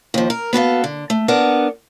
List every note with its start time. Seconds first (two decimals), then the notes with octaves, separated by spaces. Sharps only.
0.14 D#2 F3
0.30 A#4
0.53 B3 F#4 A4 F5
0.84 D3
1.10 A3
1.28 B3 D4 A#4 F#5